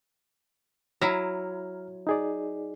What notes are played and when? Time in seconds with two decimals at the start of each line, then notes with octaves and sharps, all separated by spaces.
1.01 F#3 E4 A#5 F6
2.07 D#4 G#4 D5